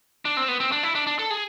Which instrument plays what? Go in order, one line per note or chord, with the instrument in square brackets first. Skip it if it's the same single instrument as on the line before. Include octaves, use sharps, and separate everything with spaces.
[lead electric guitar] D4
C4
B3
C4
D4
E4
D4
D4
A4
G#4